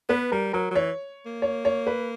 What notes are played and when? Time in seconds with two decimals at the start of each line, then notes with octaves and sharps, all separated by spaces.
0.09 B3 B4
0.32 G3 A#4
0.53 F#3 A#4
0.71 F#3
0.75 E3 C#5
1.26 A#3
1.42 C#5
1.65 C#5
1.87 B4